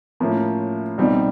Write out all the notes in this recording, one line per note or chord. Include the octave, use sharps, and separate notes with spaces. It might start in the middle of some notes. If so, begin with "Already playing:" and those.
A2 F3 A#3 C#4 E4
C2 B2 G3 C4 D#4